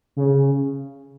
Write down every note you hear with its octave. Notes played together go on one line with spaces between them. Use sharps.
C#3